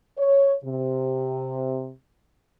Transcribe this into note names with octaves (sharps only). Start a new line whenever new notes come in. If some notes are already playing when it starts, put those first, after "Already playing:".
C#5
C3